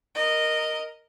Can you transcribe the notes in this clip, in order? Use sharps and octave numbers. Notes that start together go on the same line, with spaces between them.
A#4 D#5